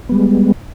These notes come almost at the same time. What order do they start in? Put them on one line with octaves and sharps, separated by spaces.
B3 G3 G#3